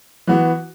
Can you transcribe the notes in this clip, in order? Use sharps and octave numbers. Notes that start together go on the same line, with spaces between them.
E3 B3 F#4